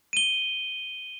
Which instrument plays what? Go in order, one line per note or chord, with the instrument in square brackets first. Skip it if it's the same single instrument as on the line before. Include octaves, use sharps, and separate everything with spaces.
[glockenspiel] D#7 G7